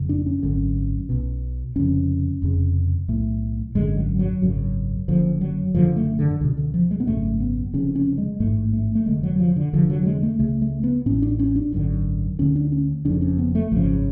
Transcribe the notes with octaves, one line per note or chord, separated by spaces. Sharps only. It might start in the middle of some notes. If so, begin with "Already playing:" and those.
Already playing: F#1 F2 C#3
D4
C#4
G#1 F#2 D3 C#4
B1 B2
F1 F2 C#3 C#4
F1 F2 C#3
B1 A2 A3
G#1 F#2 D3 G#3
F#3
F#3
G#1 F#2 C#3
F#1 F#2 D3 F3
F#3
F#1 F#2 D3 F3
A3
D3
C#2 B2 D3
D3
F3
G#3
B3
G#1 F#2 C#3 A3
B3
F1 F2 C#3 C#4
C#4
G#3
A1 G#2 A3
A3
A3
F1 F2 D3 G#3
F#3
F3
D3
F1 F2 D3 F3
F#3
G#3
A3
C#2 C#3 A3
A3
B3
A1 A2 C#4
D4
C#4
D4
G#1 F#2 D3
D2 D3 C#4
D4
C#4
F#1 F2 C#3 D4
C#4
B3
A3
G#1 F#2 C#3 F3